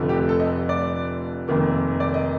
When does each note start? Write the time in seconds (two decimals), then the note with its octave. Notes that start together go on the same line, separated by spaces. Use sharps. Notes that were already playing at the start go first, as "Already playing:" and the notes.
Already playing: F1 F2 D3 F3 A3
0.09 G4
0.29 A4
0.40 D#5
0.69 D5
1.48 F1 F2 D#3 A#3
2.00 D5
2.14 D#5